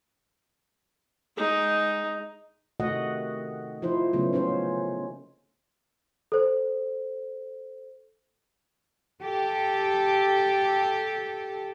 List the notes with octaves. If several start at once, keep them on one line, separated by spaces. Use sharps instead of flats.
G#3 D#4
C3 D#3 A3 F#4 D#5 F#5
F3 D#4 E4 C5
C#3 F#3 A3 B3
A#3 C#4 D#4 C5
A4 C5
G4 A4